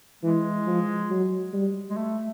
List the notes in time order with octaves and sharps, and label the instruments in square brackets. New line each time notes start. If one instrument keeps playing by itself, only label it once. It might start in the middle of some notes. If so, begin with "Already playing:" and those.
[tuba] E3 [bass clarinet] G#3
[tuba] F3
F#3
G3
[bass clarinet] G#3
A3